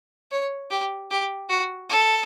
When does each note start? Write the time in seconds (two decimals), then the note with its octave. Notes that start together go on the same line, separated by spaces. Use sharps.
0.31 C#5
0.70 G4
1.10 G4
1.49 F#4
1.89 A4